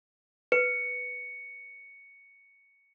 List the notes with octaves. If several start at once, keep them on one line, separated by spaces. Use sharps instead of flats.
B4 C#7